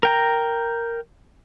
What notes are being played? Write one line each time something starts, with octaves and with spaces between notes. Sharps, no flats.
A#4 G5 A#5